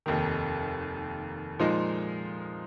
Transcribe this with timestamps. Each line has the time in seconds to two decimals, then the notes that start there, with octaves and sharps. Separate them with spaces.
0.06 F1 D#2 D#3
1.59 A#2 F3 G#3 D#4